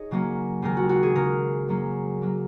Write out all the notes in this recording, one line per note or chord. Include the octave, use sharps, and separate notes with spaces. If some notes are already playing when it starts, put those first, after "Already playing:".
Already playing: D#4 G#4 C#5 D#5
C#3 F#3 A#3 C#4
D#2 C#3 G#3 A#4
F#4
F#4
G#4
C#3 A#3 C#4 A#4
F#2 F#3 A#3 C#4
F#3 A#3